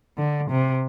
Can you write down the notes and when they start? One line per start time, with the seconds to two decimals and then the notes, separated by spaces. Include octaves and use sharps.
0.17 D3
0.50 C3